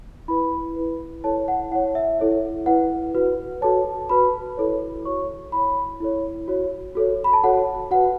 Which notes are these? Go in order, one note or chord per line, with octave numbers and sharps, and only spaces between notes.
E4 B4 B5
E4 B4
E4 A4 C#5 A5
F#5
E4 C#5 F#5
E5
E4 A4 C#5
E4 B4 F#5
F#4 B4
F#4 A4 C#5 A5
F#4 B4 B5
E4 A4 C#5
F#4 C#5 C#6
E4 C#5 B5
E4 A4 C#5
F#4 C#5
F#4 A4 C#5
B5
A5
F#4 A4 C#5 F#5
F#4 B4 F#5